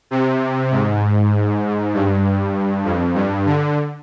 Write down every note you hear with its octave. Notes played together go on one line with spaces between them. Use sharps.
C3
G#2
G2
F2
G2
D3